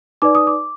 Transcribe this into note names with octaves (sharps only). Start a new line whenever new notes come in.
D#4 B4 D5 D6
D#6
D6